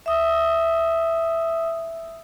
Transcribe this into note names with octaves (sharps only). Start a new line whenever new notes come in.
E5 D#6 E6